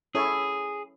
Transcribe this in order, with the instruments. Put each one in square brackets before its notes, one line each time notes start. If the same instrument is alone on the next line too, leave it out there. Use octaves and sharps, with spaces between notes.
[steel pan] C#4 E4 A4 C#5 E5 [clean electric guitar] G#4